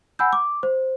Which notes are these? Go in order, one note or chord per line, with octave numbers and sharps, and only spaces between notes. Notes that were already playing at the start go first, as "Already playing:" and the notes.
F#5 G#5 B5 E6 G6
D6
C5